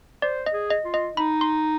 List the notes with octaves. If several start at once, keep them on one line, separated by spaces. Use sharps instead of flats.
C5 D5
D#5
G#4
D#5
F4
D#5
D#4 B5
C6